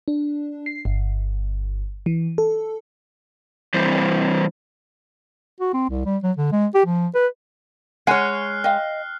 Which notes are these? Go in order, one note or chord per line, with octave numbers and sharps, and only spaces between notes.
D4
C7
G1
E3
A4
E3 G3 C4 E4 C5
F#4
C4
C2
G3
F#3
D3
G#3
G4
F3
B4
G#3 C#5 F#5 G#5 F6 F#6 C7
D#5 F5 G5